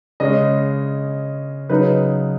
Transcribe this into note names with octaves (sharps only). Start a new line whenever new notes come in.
C#3 G#3 C#4 D#5
C#3 F#3 D#4 B4